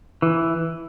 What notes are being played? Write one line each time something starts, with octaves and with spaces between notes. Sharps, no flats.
E3